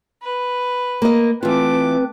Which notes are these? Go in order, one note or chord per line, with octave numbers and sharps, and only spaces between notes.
B4
A#3 D#5
E3 A3 C4 F4 B4 D6